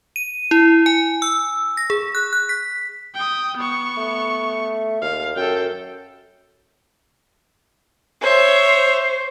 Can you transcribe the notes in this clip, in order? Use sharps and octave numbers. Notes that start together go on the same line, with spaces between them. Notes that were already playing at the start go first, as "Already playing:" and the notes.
D#7
E4
G#5
E6
A#6
G#4
F#6
F#6
B6
G5 D#6
B3 C#6
A3
D#2 F5
F#2 A4 G5
C5 C#5 E5